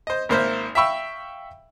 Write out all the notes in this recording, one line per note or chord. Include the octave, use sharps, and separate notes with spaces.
C5 D#5
G#1 A#3 C5 E5
E5 F5 G5 B5 C#6 E6